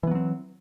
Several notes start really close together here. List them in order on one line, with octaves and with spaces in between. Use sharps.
E3 B3 F#3 C4